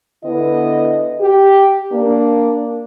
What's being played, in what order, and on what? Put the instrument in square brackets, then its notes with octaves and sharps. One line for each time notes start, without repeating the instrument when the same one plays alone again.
[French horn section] D3 B3 E4 D#5
G4
A#3 D4